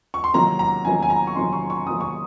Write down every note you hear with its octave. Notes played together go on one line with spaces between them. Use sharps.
C#6
C6
C3 D#3 F#3 A#3 A#5
A#5
C3 D#3 F#3 A#3 G#5
G#5
A#5
C#6
C3 D#3 F#3 A#3 C6
C#6
C#6
C3 D#3 F#3 A#3 D#6
C#6